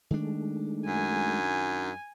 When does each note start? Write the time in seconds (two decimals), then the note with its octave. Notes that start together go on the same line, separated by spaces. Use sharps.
0.11 D#3 G#3 A3 D4
0.87 F#2 G#5